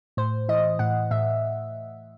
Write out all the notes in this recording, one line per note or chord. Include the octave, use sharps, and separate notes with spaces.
A2 C5
E3 D#5
A2 F#5
A2 E5